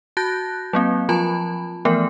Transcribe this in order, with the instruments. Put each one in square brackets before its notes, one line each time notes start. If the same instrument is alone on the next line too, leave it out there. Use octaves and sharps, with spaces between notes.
[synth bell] F#4 A5 F#6 G6 A#6
F#3 A#3 C4
F3 F4 A5 B5
E3 F3 A3 B3 A#4